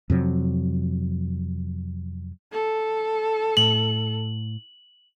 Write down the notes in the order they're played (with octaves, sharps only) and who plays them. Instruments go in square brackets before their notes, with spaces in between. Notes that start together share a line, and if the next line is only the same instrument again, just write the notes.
[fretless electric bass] F2 C3 F#3
[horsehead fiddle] A4
[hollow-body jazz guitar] A2 [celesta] F#7